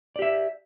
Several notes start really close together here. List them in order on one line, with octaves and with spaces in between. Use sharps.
D5 G4 E5